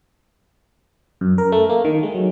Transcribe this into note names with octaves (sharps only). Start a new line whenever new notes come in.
F#2
A#4
A3
A#3
D#3
G#3
F#3